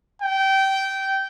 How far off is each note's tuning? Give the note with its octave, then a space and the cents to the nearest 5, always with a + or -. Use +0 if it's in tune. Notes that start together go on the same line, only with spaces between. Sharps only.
G5 -20